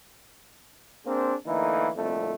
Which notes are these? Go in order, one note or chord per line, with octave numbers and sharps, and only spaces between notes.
A#3 C4 D4 G#4 C5
D3 E3 A3 A#3 D#4
C2 F2 A#2 D3 A3